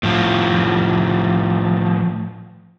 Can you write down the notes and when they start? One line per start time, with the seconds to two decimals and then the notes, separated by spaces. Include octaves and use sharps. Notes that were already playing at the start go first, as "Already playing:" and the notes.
0.03 A2 F3